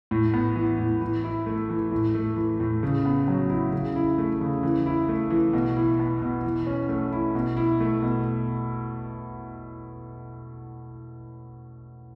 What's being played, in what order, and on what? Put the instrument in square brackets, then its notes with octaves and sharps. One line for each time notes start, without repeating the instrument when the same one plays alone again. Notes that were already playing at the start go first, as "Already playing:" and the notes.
[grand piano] A2
B3
E3
A2
E3
E4
A3
E3
A2
A3
E3
A2
C#3
B3
F#3
E4
C#3
E4
A3
C#3
E3
E4
A3
E3
B2
E4
B3
B2
E3
C#4
A3
E4
B2
E4
A3
B2